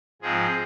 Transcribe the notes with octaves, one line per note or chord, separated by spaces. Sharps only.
G#2 F3 G#3 C4 G#4